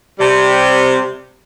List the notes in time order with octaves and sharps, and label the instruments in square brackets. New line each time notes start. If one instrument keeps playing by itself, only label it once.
[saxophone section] C3 G3